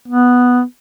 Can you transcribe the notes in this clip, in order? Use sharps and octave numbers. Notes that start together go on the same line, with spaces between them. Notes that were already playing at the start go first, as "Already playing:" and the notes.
B3